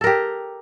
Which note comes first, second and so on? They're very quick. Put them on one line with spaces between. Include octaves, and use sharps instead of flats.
A4 A#4 G4